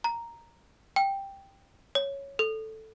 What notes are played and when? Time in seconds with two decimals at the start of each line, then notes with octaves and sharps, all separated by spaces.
0.04 A#5
0.96 G5
1.95 C#5
2.39 A4